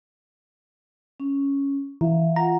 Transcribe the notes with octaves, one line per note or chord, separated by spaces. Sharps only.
C#4
E3 E5 F5
F4 F#5 A#5